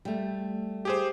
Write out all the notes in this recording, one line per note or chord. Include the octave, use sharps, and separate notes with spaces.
G3 A3
G4 G#4 C5